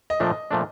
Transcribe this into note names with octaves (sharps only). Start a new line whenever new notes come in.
D#5
A#2 F3 A3 D4 D#5
A#2 F3 A3 D4